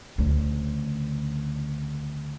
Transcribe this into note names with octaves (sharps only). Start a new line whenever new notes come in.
D2 C#3